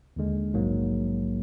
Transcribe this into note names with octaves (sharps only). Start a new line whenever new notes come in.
D#2 D3 G#3
A#1 G#2 F#3 A#3